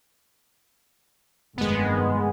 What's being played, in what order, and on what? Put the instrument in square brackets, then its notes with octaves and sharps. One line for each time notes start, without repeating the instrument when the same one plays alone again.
[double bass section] F1 G2 D#3 [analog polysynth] G#3 B3